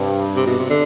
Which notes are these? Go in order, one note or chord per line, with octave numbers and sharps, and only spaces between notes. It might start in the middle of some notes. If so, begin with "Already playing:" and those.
Already playing: G2 C3
C3
B2
C3
D3